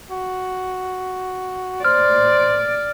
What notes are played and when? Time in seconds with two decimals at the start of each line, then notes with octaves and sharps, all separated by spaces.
0.10 F#4
1.85 C5 D5 F6